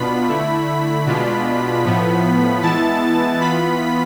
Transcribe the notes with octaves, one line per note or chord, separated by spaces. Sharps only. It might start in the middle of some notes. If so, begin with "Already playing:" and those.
Already playing: B2 B3 D4 F4 B5 B6
D3 A3 E4
B2 G#3 D4 F4
A2 F3 B3
E3 G#3 B3 E4 A5 A6
E3 B3 F4 B5 B6